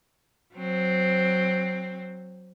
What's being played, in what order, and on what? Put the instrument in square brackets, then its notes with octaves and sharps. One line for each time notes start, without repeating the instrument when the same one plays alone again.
[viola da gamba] F#3 C4